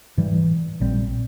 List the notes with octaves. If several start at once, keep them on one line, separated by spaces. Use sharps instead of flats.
G#2 E3 G3
A#1 A#2 G3 C4